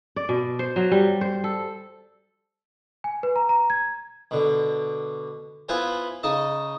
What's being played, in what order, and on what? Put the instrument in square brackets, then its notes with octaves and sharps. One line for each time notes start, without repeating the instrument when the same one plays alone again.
[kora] D5
B2
C5
F#3
G3
C5
A4
[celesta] G#5
B4
A#5
A#5
G#6
[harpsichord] B2 D3
B3 E4 F4 B4 C5 G#5
C#3 D#4 D#5 A5